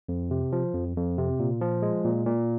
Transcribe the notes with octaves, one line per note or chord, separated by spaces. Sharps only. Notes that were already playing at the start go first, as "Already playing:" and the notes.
F2
C3
F3
F2
F2
C3
A#2
F3
G#3
A#2
A#2